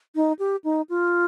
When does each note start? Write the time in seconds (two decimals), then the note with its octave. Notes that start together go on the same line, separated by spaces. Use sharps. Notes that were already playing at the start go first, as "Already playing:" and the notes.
0.15 D#4
0.39 G4
0.64 D#4
0.89 F4